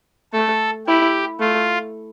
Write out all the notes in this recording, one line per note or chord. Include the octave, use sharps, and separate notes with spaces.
A3 A4
E4 G4
A3 F4